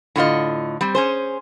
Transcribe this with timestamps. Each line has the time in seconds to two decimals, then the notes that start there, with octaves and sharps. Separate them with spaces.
0.16 A2 D3 F4 D#5
0.81 G3 C4
0.95 C#4 G#4 C5